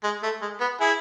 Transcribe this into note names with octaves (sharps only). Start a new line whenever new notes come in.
G#3
A3
G#3
B3
E4 G#4